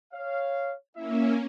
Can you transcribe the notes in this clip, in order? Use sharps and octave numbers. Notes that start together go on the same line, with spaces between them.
C#5 F5
A#3 C#4 E4 E5